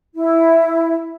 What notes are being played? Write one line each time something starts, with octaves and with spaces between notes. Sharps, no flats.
E4